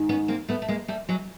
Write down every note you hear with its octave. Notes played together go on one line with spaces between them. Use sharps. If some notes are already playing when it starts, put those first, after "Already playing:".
Already playing: G#2 D#3
B3 C#4
A#3 C4
A3 B3
A3
G#3 A#3
G3 A3
F#3 G#3